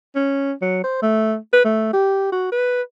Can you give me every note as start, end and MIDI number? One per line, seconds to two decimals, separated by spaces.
0.16 0.53 61
0.62 0.81 54
0.84 1.02 72
1.02 1.35 57
1.53 1.62 71
1.65 1.91 57
1.93 2.31 67
2.32 2.49 66
2.52 2.82 71